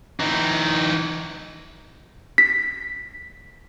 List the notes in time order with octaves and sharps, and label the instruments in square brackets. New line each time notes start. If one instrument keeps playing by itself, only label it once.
[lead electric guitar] E3 D#4
[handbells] B6